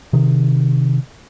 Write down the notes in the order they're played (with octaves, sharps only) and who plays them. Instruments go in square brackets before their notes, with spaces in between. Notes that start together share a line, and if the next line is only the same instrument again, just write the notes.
[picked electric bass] C3 D#3